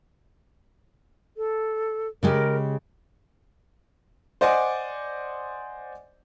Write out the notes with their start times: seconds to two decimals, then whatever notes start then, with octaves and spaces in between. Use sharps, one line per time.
1.37 A4
2.23 C#3 G#3 G4 A#4
4.41 C5 D5 D#5 F#5 G#5 D6